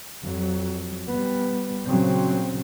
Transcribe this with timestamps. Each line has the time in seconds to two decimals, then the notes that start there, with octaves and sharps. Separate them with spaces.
0.24 F2 F#3
1.11 G3 B3
1.87 A#2 C#3 F#3 C4